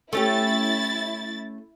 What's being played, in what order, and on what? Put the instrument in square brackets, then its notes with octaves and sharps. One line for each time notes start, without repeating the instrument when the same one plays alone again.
[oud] A3 C#4 G4 [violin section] E4 A6